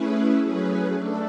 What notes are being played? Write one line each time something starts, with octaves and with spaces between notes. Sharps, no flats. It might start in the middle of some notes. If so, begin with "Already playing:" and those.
Already playing: A3 C#4 E4 G#4 B4
F#3 A3 C#4 G#4 B4
A3 D4 A4